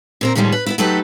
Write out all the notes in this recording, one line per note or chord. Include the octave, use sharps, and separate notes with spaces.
A#2 C4 A#4
A2 D#3 F3 G3 G#3
B4
B3 D#4 E4
F#3 A3 D#4 G4 A4 B4